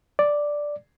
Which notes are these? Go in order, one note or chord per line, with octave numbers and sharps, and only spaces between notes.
D5